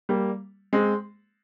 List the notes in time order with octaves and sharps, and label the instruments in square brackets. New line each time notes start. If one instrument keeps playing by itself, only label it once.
[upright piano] G3 A#3
G#3 C4